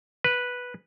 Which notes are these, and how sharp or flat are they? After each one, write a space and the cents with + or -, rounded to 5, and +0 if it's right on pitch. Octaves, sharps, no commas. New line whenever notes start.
B4 -5